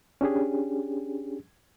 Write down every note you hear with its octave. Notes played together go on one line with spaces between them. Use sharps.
C#4 D4 G4 G#4